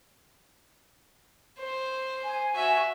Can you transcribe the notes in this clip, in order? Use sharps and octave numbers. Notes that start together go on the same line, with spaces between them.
C5
G#5
F#4 E5